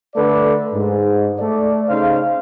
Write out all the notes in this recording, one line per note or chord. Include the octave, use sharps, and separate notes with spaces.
D3 A3 A4 B4 D5
G#2
A3 A4 D5
C#3 D#4 C5 F5